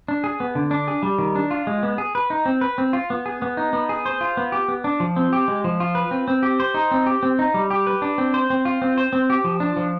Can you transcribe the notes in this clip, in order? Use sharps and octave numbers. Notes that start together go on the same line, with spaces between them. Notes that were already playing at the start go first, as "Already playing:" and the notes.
D4
G#4
B3
D3
D4
G#4
G3
D#3
D4
F4
G#3
B3
G#4
B4
D#4
C4
B4
C4
F4
B3
G#4
B3
D#4
B3
G#4
C5
F4
B3
G4
B3
D4
F3
C4
G4
G#3
F3
F4
B4
C4
C4
G4
C5
D#4
C4
G4
C4
D#4
G3
G4
B4
D4
C4
C5
C4
F4
C4
C5
C4
G4
F3
D4
F3